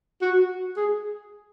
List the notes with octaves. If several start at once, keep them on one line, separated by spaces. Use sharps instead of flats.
F#4
G#4